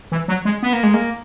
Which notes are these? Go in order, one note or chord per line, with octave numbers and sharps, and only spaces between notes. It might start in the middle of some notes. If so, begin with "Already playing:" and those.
E3
F#3
G#3
B3
A#3
G#3
A#3